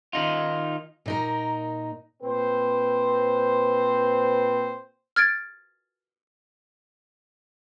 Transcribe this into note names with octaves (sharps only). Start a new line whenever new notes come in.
D#3 D#4 F4
A#2 D#4 A#4
A#2 C4 B4 C5
F6 G#6 A6 D7